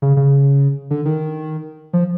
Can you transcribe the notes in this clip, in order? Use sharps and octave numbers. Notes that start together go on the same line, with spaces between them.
C#3
C#3
D3
D#3
F3